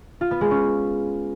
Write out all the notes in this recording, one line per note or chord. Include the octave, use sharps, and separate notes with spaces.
F4
B3
G#3
C#4